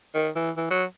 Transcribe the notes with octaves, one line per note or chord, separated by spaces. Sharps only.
D#3
E3
E3
F#3